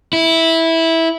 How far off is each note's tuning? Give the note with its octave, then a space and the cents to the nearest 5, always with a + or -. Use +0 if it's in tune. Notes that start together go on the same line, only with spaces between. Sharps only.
E4 -10